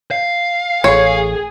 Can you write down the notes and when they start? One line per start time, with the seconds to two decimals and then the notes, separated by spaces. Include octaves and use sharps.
0.11 F5
0.84 A1 G#4 C#5